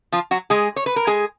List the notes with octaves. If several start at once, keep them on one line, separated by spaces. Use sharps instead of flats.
F3 F4
F#3 F#4
G#3 G#4
C#5
B4
A#4
G#3 G#4